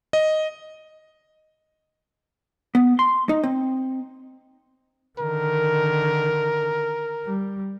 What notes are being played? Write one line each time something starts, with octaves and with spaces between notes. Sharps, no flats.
D#5
B3
C6
D#4
C4
D3 D#3 A#4
G3